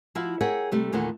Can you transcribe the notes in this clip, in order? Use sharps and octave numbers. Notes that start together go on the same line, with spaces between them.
F3 E4 F#4 E5 F5
G#4 A#4 C#5 E5 F#5 G5
C3 G3 A3
E2 A#2 D#3 A3 E4 F#5